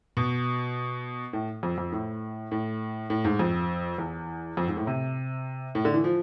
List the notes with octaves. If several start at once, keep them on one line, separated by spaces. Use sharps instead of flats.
B2
A2
F2
F2
A2
A2
A2
G#2
F2
E2
F2
G#2
A2
C3
A2
D3
E3
F3